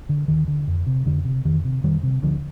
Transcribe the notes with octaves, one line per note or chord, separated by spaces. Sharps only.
D3
D#2 D#3
D3
F2
C3
F2 D3
C3
F2 D#3
C3
F2 D#3 G3
C3
D2 D3 F3